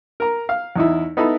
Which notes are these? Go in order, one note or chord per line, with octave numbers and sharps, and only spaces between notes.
A#4 A#5
F5
E2 D#4 E4
B3 D#4 E4 A4 B5